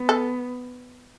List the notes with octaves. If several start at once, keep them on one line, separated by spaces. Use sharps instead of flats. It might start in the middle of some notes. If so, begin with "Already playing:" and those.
Already playing: B3
A4